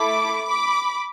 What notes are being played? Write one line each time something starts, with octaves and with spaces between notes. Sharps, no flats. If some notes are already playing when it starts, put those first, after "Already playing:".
Already playing: A3 E4 A4 B5 D6
B5 D6